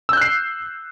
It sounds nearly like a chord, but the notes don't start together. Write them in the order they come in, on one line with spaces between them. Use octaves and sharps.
E6 G6 F#6 C7